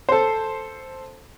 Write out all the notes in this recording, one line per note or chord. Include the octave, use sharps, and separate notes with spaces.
A4 C5